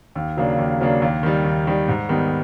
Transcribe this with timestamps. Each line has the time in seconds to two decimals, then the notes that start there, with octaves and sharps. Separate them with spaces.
0.16 D#2
0.37 C#3 F#3 A#3 D4
0.59 D#2
0.81 C#3 F#3 A#3 D4
1.02 D#2
1.23 D#3 G3
1.45 D#2
1.67 D#3 G3
1.88 G#2
2.09 D#3 G3 B3